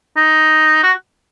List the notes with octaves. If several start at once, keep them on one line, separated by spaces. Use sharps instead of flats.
D#4
F#4